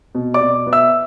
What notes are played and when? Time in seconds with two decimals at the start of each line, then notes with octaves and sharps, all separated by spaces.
0.15 B2
0.34 D5 D6
0.41 B2
0.67 B3
0.73 E5 E6